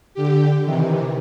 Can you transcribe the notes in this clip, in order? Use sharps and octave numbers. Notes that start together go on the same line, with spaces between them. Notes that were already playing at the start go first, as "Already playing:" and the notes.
D3 G4
C3 D#3 E3